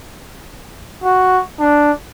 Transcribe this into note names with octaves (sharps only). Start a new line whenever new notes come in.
F#4
D4